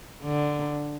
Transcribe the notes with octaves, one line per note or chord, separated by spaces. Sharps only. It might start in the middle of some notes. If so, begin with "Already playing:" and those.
D3